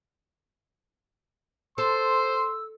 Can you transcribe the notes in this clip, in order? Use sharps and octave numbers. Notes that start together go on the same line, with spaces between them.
A4 C5 C6 E6